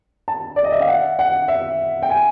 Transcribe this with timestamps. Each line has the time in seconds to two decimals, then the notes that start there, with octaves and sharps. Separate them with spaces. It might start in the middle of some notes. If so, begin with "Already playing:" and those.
0.28 A5
0.56 D5
0.64 D#5
0.72 E5
0.81 F5
0.88 F#5
1.19 F#5
1.48 E5
2.02 G5
2.10 G#5